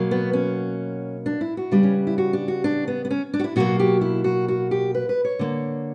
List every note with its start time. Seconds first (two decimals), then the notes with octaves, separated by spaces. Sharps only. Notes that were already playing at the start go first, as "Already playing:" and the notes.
Already playing: B2 F#3 A#3
0.11 B3
0.33 C#4
1.26 D4
1.41 E4
1.57 F#4
1.71 C#3 G3 B3 D4
1.83 C#4
2.07 E4
2.18 F#4
2.33 D4
2.48 F#4
2.64 D4
2.88 B3
3.05 B3
3.11 C#4
3.34 D4
3.39 F#4
3.44 E4
3.56 B2 F#3 A#3 F#4
3.80 G4
4.01 E4
4.24 F#4
4.48 F#4
4.71 G4
4.95 B4
5.09 B4
5.25 C#5
5.39 D3 A#3